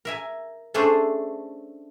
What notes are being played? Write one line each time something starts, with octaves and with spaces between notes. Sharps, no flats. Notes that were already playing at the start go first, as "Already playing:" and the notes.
A#4 E5 G#5
A3 C#4 D4 G#4 A4 C5